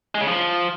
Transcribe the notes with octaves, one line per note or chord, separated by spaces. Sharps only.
G#3
C#3
F3